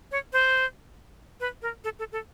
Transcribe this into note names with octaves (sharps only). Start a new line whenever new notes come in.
C#5
C5
B4
A#4
A4
A4
A4